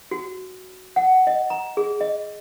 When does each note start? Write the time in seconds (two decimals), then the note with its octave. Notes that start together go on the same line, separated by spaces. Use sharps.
0.11 F#4
0.96 F#5
1.27 D#5
1.50 A#5
1.77 G#4
2.01 D#5